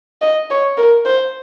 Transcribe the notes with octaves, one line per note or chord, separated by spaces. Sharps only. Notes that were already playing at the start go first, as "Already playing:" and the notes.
D#5
C#5
A#4
C5